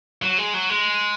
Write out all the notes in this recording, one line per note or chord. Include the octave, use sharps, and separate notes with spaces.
F#3
G#3
F#3
G#3